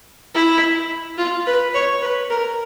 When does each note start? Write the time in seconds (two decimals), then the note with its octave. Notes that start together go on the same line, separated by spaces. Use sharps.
0.34 E4
1.18 F4
1.46 B4
1.74 C#5
2.01 B4
2.30 A#4